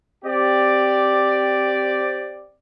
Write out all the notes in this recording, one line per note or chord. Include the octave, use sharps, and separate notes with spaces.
C4 G4 D5